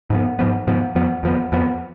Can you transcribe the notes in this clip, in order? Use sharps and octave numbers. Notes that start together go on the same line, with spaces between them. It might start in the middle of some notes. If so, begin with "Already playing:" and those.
G#2 F3 B3
G#2 F3 B3
G#2 F3 B3
F2 F3 B3
F2 F3 B3
F2 F3 B3